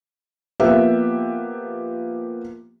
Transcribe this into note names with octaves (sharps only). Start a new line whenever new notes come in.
F3 A#3 B3 G4 E5